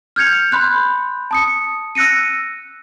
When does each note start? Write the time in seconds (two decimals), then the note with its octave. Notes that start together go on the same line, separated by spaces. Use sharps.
0.16 F6 G6 G#6 C#7 F7
0.51 B5 C6 F#6 G6
1.31 A5 D#6 C#7
1.95 E6 F#6 A#6 C#7 D#7